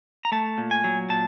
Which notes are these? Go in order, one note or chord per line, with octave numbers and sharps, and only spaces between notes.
A#5
A3 A5
A#2
G#5
F#3
A#2 A5